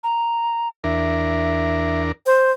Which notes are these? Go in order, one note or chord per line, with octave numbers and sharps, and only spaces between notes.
A#5
E2 D4 A#4 E5
C5